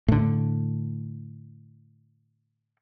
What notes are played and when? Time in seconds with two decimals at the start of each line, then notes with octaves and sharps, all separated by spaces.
0.08 A2 D3